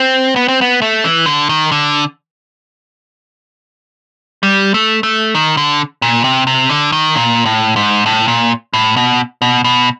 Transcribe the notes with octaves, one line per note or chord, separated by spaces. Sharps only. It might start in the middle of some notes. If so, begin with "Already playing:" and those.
Already playing: C4
B3
C4
B3
A3
E3
D3
D#3
D3
G3
A3
A3
D#3
D3
A#2
C3
C3
D3
D#3
A#2
A2
G#2
A2
A#2
A2
B2
B2
B2